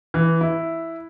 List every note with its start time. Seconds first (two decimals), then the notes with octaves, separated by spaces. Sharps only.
0.14 E3
0.41 E4